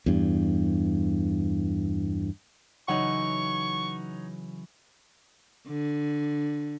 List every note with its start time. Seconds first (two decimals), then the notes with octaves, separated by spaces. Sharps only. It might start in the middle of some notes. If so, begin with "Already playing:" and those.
0.06 E2 G2
2.88 C#3 E3 F#3 D#4 C#5 F#5 C#6
5.68 D3